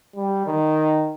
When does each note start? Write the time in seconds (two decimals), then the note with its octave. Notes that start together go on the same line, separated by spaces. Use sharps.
0.16 G3
0.47 D#3